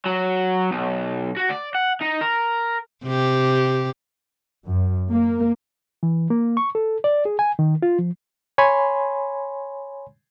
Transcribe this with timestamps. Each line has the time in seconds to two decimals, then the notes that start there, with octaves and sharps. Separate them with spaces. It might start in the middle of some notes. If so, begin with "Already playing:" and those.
0.06 F#3
0.71 B1
1.37 F#4
1.50 D5
1.75 F#5
2.01 D#4
2.21 A#4
3.04 C3 G4
4.65 F#2
5.09 A#3
6.03 E3
6.30 A#3
6.57 C#6
6.75 A4
7.04 D5
7.25 G#4
7.39 G#5
7.59 D#3
7.82 F4
7.99 F3
8.58 C#5 G#5 B5 C6